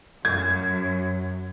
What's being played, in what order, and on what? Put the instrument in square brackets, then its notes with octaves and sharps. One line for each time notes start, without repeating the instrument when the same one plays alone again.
[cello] F#2 [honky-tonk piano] G#6